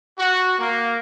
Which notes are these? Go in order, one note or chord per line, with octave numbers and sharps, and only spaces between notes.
F#4
A#3